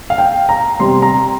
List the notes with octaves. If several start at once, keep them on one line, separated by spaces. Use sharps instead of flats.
F5
G5
A#5
C3 G3 C4 C6
A#5